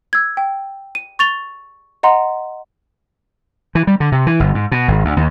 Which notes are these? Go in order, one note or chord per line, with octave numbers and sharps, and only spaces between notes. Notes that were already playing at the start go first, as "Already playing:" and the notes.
E6 G#6
G5
D#7
C#6 A6 F7 G7
D#5 F#5 A#5 C6
E3
G3
D3
C3
E3
G1
G#2
B2
G#1
D2
D#2